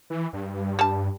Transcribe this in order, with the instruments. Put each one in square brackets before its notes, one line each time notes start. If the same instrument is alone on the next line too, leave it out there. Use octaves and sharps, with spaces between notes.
[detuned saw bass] E3
G2
[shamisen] G3 A5